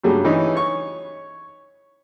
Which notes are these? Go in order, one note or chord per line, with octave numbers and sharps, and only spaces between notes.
G2 C#3 F#3 G3 A3 A4
E3 C#4 D#4
C#5 C#6